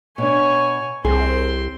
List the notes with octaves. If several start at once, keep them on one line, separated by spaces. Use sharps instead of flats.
B2 D4 C#5 G#5
C2 C4 G#4 C6